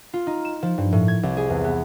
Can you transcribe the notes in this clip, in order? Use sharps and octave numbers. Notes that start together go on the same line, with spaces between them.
F4
D#4
E7
F3
G2
A2
G#6
C2
G#4
E2
B3